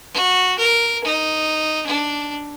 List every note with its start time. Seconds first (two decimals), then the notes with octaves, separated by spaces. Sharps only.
0.14 F#4
0.58 A#4
1.04 D#4
1.86 D4